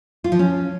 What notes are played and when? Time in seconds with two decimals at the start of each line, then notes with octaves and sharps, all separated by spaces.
0.24 F4
0.32 F3
0.39 C#4